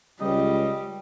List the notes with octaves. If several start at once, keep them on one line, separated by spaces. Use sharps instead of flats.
C#2 G3 D#5